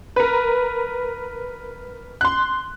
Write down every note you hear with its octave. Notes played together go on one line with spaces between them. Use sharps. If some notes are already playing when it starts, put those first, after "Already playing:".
A#4 B4
C6 F#6